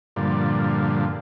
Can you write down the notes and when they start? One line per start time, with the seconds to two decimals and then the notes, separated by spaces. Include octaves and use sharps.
0.16 G2 A#2 D3 F3